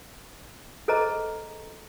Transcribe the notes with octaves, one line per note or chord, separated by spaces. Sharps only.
G#4 A4 B4 C5 D#5 A#5